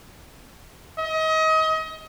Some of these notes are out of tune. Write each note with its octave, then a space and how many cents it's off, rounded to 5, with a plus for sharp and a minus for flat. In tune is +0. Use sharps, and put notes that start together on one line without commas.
D#5 +30